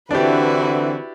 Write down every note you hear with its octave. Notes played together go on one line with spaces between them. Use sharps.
D3 E3 C4 D4 E4 F#4 G4 B4